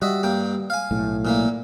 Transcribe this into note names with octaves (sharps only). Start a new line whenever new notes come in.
G3 F#4 D#5 E5
G2 A#3 G5
F5 G#5
B1 A2
A#2 E3 A#3